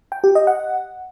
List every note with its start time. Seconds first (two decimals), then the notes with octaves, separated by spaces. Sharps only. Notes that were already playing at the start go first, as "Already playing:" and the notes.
0.12 G5
0.24 G4
0.35 D#5
0.47 F#5